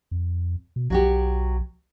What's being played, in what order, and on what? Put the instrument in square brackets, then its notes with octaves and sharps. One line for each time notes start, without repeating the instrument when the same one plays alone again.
[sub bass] F2
B2
[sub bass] B1 [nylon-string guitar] F#3 F#4 G4